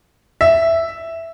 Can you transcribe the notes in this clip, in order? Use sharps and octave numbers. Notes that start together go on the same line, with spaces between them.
E5